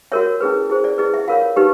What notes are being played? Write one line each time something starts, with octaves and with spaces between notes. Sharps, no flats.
F#4 A#4 C#5 E5
C#4 E4 G#4 B4
E4 G#4 C5
D5
E4 G#4 B4 D#5
E5
F4 A#4 C#5 F5
D#4 G4 B4